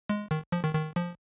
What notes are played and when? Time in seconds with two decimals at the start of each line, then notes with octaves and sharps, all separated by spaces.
0.09 G#3
0.31 D#3
0.52 F3
0.64 D#3
0.75 D#3
0.96 F3